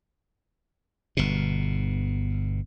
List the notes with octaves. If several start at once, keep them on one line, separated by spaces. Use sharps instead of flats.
G1 B2